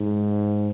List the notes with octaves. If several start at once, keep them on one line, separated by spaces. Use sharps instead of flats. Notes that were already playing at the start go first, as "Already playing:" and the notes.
Already playing: G#2